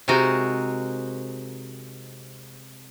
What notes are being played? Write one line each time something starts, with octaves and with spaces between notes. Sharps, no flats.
C3 G#3 D#4 F#4 A#4